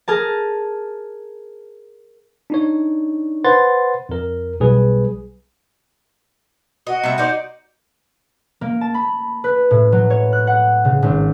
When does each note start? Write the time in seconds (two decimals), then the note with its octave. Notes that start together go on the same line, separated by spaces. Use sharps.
0.08 G#4 A#4 A5
2.50 D4 D#4 C#5
3.44 B4 C5 F#5 C6 A6
4.09 F2 A#4
4.60 B1 G3 G#4 B4
6.87 F#4 D#5
7.03 C3 G3 E5
7.18 D#4 C5 D5
8.61 A#3
8.81 A5
8.94 B5
9.44 B4
9.71 A2
9.92 F#3
10.10 C#5
10.33 F#6
10.47 F#5
10.85 C#3
11.02 G#1